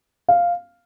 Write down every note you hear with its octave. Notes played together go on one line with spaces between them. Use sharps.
F5